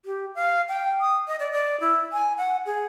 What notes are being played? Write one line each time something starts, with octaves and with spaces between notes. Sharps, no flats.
G4
F5
G5
D#6
D#5
D5
D5
E4
G#5
F#5
G#4